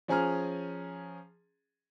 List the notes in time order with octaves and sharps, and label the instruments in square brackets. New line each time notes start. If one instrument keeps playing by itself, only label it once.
[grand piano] F3 C#4 G#4 A#5 F6